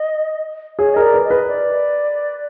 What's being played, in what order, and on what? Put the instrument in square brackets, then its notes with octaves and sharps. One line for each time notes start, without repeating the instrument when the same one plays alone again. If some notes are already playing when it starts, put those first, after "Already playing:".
Already playing: [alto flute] D#5
[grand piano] G#4 [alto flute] C#5
[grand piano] A#4 [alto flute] D#5
[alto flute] D5
[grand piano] B4
[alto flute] D#5
[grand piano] B4
[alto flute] D5